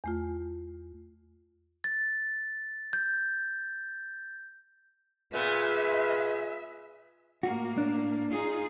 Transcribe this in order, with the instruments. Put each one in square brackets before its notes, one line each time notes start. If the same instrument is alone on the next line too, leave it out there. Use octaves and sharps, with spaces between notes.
[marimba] E2 A3 F4
[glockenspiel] A6
G6
[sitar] A#2 B3 [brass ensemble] F4 G#4 [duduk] B4 [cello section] E5
[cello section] A2 A#3 [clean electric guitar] F#4
[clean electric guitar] D4
[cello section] D#4 F4 G#4